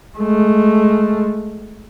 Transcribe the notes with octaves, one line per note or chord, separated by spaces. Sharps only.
G#3 A3